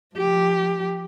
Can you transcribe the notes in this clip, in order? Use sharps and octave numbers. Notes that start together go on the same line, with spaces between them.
F3 G4